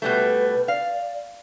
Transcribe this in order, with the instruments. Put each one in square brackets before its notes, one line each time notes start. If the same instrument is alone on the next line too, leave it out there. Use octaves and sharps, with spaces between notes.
[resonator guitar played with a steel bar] B2 G3 A3 [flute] B4
[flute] D5 [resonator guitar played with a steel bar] F5